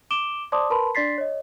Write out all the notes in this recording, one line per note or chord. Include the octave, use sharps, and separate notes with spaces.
D6 D7 E7 G7
C5 D5 A5 C6 D6 D#6
A#4 B4 A5 B5 C6
D4 D5 C6 A6 B6 C7
C#5 D#5